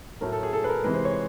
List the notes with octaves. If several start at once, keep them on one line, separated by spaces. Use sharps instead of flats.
A2 F#3 A3 A#4
A4
G#4
A4
B4
A#4
C3 E3 G#3 B4
C5
C#5